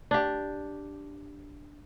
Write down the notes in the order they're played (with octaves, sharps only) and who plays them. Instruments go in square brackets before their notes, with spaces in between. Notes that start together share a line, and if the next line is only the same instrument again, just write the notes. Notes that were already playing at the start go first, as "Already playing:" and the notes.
[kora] D4 G4